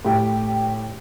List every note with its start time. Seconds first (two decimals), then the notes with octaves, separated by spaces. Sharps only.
0.05 A2 G4